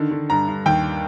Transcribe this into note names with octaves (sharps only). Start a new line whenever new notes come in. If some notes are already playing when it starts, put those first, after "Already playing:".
Already playing: D3 D#3
D3
G2 A#5
G2
D#2 G5